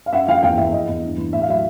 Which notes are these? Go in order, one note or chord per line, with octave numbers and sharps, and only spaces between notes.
F5
F#2 E5 F#5
F3 F5 G5
E2 F5 G5
E2 E5
E2 D#5
E2
G2
E3
A2 E5
F5
F#3 E5